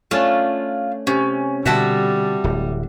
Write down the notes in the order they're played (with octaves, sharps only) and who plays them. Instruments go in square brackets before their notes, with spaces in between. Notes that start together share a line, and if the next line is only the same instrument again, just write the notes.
[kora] A3 C#4 D4 [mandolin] F4
[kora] C3 [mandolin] C#4
[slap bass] B2 D3 [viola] G3 [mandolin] F#4 E5 A5
[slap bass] D1